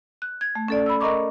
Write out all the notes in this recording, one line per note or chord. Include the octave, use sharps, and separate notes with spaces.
F#6
G#6
A3
C#4 A4 D5
B5 E6
A#4 D#5 A#5 C#6 D6